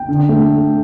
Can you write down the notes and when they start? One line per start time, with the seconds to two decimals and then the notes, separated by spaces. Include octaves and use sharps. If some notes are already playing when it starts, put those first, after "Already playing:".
Already playing: G5
0.08 D3
0.29 A3